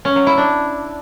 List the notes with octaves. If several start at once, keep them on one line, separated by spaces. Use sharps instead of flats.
C#4
F#3
E4
D4